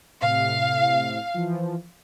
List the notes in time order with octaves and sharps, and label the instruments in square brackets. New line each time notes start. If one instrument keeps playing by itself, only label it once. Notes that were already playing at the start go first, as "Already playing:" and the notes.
[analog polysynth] A2 C3 [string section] F5
[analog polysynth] E3 F3